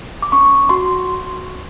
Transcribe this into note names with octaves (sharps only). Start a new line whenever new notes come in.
D6
C#4 C#6
F#4 C6